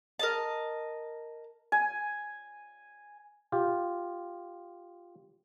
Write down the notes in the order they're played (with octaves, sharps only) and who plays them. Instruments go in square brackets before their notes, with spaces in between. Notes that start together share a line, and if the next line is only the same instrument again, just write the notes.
[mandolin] A#4 D#5 A5
[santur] G#5
[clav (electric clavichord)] F4 G4